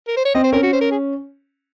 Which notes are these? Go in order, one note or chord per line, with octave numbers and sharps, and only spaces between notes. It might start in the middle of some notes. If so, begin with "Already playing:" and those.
A#4
C5
C#5
C4 D#5
C5
C#4 A#4
F#4
C5
A#4
G#4